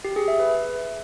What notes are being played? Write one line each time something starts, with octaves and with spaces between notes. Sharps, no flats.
G4
G#4
E5
B4